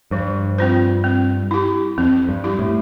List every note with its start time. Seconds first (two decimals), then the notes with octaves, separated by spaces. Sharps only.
0.11 G2 F3
0.58 C4 F4 C5
1.04 C4
1.51 E4 G4
1.98 F2 C4
2.29 G2
2.44 E4 G4
2.59 A2